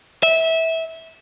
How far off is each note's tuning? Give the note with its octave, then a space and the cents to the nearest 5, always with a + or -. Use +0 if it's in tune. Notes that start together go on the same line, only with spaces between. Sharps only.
E5 -20